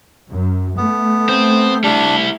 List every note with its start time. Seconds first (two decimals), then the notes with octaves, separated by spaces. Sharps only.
0.30 F#2
0.77 A3 B3
1.29 C4
1.84 G3 D4 E4